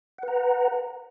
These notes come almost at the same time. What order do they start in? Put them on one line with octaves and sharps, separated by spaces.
F#5 B4 A#5